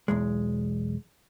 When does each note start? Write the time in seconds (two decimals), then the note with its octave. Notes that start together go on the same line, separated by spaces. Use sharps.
0.08 B1 E2 G#3